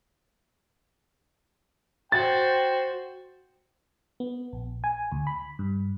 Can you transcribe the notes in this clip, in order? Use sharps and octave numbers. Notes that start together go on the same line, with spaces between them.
F#4 C5 G5 A6
B3
A#1
G#5
D2
B5
G2